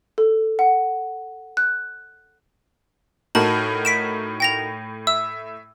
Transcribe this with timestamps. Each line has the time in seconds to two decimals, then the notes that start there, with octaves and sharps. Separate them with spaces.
0.18 A4
0.59 F#5
1.57 F#6
3.35 A2 D#4 F#4 A#4 A5 F#7
3.85 B6 D7 E7
4.40 G5 A#6 F7
5.07 E5 E6